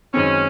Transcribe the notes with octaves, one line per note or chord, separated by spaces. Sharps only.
F#2 D#3 G#3 C4 C#4